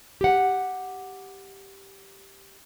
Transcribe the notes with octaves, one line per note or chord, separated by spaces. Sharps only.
G4 F#5